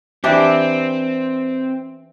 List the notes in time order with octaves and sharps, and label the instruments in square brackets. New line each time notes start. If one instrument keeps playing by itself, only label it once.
[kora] E3 D4 G4 [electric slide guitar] C4